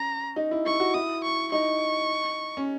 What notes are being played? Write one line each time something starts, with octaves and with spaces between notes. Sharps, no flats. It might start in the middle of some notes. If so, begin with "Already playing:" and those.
Already playing: C#4 A#5
D#4
E4
E4 C#6
F#4
E4 D#6
C#6
D#4 C#6
C#4